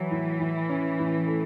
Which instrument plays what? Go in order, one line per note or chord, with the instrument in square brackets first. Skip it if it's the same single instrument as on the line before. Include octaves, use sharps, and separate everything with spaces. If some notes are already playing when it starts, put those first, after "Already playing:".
Already playing: [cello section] E3 [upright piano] F#3
[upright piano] A2
A2
C#4
A2
A3